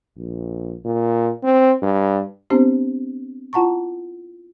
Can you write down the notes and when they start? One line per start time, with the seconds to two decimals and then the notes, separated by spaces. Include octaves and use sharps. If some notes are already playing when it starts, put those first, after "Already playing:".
0.17 A#1
0.85 A#2
1.43 C4
1.82 G2
2.50 B3 C4 D4 G4 C5
3.53 E4 F4 F#5 A5 A#5 C#6